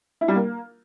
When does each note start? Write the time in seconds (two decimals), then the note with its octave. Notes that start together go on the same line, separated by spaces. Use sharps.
0.21 E4
0.28 G3
0.35 A#3